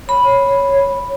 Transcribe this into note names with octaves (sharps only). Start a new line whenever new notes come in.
C#5 B5